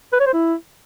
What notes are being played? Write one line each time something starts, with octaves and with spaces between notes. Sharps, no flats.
B4
C#5
C5
E4